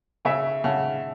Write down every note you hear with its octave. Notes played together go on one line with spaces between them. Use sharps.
C#3 E5 G#5
C#3 F#5 A5